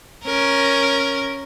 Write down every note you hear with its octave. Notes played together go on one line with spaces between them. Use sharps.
C#4 A#4